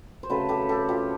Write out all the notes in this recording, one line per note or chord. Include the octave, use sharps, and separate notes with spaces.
C5
C#3 F#3 A3 C4 A4 B4
G4 A4
G4 A4
F4 G4